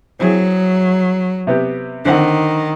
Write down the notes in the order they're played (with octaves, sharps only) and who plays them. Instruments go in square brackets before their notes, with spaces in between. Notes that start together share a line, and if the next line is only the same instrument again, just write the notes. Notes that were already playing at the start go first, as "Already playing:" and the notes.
[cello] F#3 [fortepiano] C4 E4 G#4
[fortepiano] C3 B3 G4
[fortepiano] D3 C4 F#5 [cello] D#3